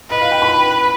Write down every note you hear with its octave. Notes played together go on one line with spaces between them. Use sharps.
B4 D#5
F5
G5
B5